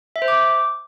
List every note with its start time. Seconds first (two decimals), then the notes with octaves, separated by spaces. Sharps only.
0.16 E5
0.22 C5
0.28 D6